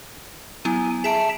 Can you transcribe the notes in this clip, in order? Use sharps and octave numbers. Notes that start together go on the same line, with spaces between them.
F#3 B3 E4 G#5
G#4 E5 A5 A#5 D7